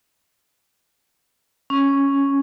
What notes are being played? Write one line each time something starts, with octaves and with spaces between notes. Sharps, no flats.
C#4